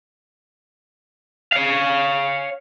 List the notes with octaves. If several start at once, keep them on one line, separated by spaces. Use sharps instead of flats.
C#5 F5